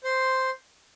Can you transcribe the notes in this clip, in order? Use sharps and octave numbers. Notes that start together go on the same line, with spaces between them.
C5 C6